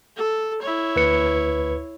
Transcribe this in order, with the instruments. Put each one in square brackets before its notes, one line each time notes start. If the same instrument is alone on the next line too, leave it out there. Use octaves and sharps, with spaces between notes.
[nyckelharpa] A4
E4 C#5
[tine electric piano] D2 B4 C#7